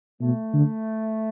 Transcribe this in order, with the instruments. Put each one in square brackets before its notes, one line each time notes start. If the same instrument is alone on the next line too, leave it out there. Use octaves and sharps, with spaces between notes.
[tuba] B2 [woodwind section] A3
[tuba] D3